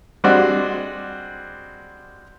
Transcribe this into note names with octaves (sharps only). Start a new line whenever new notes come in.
G3 G#3 C4 D4 F#4